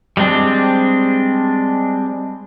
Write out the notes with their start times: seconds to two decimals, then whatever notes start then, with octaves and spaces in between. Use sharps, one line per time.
0.17 G3 G#3 C4 D4